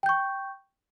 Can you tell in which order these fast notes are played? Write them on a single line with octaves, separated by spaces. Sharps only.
G5 G6 C#6